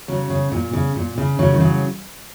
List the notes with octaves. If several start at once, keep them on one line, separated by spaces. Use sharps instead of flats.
C#3 F#3
C#3
A#2
C#3
A#2
C#3
C#3 F#3
D#3
C#3 F#3